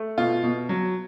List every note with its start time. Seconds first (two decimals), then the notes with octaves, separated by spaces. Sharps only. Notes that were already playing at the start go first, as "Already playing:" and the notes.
Already playing: A3
0.18 B2 F4
0.43 B2
0.69 F#3